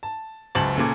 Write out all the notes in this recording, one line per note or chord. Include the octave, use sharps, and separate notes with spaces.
A5
F#1 C#2 A5 F#7
A#2 C#3 A4